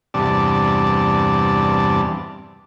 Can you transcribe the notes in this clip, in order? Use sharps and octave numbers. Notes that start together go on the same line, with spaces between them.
E2 G2 C3 D5 A5